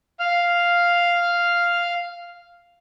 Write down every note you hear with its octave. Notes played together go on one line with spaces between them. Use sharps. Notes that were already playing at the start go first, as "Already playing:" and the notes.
F5 F6